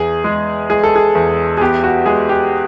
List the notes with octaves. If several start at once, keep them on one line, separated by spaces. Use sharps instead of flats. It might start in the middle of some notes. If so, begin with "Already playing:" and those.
Already playing: E2 G#4
G#3
G#3 G#4
A4
G#4
E2
G#4
B3 G4
F#4
G#3 G#4
G4